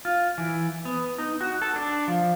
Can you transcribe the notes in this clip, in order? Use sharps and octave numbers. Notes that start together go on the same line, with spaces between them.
F4
E3
B3
D#4
F#4
A4
D4
F3